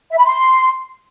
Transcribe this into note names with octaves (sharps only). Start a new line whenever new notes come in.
E5
B5
C6